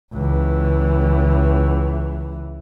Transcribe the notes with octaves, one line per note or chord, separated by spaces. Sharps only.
C#2 E3